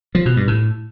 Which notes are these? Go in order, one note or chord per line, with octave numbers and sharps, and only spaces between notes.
F3
B2
G2
A2